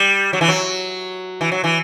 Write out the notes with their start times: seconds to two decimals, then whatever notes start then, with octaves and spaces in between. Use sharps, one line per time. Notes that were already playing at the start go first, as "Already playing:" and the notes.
Already playing: G3
0.33 F#3
0.41 E3
0.48 F#3
1.41 E3
1.52 F#3
1.64 E3